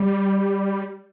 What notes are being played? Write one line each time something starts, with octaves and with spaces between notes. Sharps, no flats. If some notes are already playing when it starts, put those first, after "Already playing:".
Already playing: G3